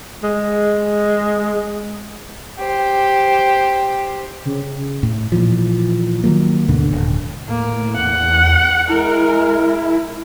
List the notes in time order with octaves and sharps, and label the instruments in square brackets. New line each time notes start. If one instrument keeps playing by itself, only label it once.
[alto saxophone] G#3
[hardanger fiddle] G4 C5
[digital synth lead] C#3
[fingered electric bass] A2
A#2 E3 F3
D#3 F#3 A#3
D2 G#2 B2 D3
D#1
[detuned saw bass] A2 [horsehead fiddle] A#3
[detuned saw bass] E2 [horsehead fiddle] F#5
[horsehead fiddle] G#3 A#4 [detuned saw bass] E4